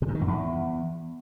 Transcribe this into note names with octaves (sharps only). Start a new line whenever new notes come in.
C3
G#2
D#3
F#2
E2